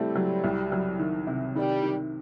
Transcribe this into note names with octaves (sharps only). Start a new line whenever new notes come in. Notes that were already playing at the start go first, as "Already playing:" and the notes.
Already playing: A2 G3 A3 C4
F#3
C2
F#3
D#3
C3
D#3 G3
D#3